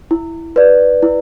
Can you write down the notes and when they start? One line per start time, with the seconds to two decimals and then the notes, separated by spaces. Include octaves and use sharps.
0.11 E4
0.56 B4 D5
1.03 E4